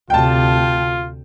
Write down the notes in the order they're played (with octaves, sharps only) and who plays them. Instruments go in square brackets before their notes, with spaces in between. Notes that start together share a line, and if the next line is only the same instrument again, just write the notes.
[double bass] D2 C3 [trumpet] F4 [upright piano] G5 A5